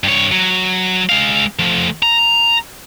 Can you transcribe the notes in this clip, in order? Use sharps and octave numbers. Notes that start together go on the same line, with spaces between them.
G2 C#5
F#3
G#3 F5
F3 A3
A#5